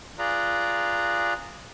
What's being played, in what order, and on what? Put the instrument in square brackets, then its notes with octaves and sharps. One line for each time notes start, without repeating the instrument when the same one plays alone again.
[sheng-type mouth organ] F4 G#4 B4 D5 A#5